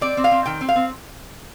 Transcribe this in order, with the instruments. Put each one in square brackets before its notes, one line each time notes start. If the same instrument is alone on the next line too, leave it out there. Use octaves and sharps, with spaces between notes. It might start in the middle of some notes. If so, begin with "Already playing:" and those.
[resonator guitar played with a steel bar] C4 D5
C4
F5
C4
D#3 G5
C4
F5
C4